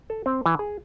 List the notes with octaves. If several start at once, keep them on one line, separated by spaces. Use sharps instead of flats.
A4
C4
E3
G#4